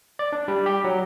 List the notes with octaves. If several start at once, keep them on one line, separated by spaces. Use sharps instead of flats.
D5
D4
G3
G4
F#3